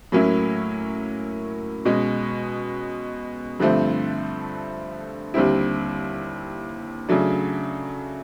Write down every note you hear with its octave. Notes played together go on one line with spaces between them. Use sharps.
A2 F#3 A#3 C#4 E4
B2 G#3 C#4
G2 D3 F3 A3 C4
D#2 D3 G3 C4 E4
C#3 F#3 A3 D4